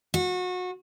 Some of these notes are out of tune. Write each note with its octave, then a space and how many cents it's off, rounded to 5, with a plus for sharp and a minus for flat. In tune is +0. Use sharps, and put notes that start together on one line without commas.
F#4 -30